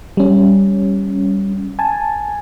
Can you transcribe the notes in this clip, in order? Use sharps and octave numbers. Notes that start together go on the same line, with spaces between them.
G3 C#4
G#5 A5